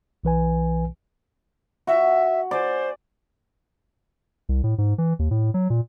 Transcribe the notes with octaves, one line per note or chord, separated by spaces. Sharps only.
B1 E3 B4 G#5
F#4 E5
C5 D5 G#5
C2
A2
G#2
E3
D#2
A2
F#3
A#2